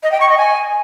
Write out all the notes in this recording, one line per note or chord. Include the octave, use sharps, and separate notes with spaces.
D#5
G5
C#6
D#5
G#5